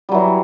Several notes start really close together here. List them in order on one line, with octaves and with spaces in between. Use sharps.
G3 F#3 E3